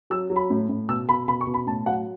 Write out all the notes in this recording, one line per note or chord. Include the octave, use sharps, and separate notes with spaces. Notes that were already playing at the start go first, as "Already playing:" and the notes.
F#3 E6
F#3
B5
A2
A2
B2 E6
B2 B5
B2 B5
C#6
B2
B5
A2 A5
F#3 F#5